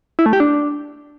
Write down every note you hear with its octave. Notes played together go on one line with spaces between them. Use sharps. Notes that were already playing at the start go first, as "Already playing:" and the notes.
E4
A3
G4
D4